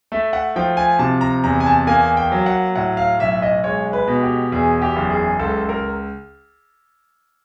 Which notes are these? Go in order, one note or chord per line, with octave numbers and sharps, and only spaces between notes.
A3 E5
F#5
F3 G5
G#5
C3 A5
A#5
E2 A#5
G#5
A5
A#3 G#5
G5
F#3
F#5
A2 F#5
F5
B1 E5
D#5
G#3 C#5
B4
B2
G4
E2 G#4
G4
F#1
G#4
C#2 A4
A#4